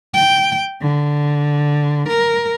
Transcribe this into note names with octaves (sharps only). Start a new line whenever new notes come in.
G5
D3
A#4